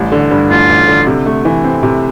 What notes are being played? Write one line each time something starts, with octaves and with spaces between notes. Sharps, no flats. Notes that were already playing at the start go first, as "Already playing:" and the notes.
Already playing: A1 G3
D3
G2
A1 F4
A1
D3
C3
A3
E3
C4
C3